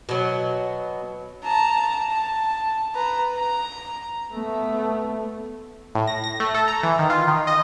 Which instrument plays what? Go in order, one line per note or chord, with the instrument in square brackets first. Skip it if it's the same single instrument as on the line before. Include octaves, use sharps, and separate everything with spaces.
[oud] B2 F#3
[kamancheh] A5 A#5
A5
B4 A#5
A#5
[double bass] A3 B3
[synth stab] A2
A#6
A#6
A3
A4
A#5
E3
D#3
F4
D#3
D#5